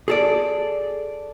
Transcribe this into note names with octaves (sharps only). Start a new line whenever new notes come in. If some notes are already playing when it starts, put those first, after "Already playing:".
G#4 A4 D5